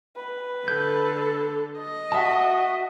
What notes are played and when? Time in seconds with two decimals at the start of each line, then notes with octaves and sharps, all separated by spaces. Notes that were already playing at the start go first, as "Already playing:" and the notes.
0.16 B4
0.68 D3 A4 G6
1.80 D#5
2.12 F#4 E5 A5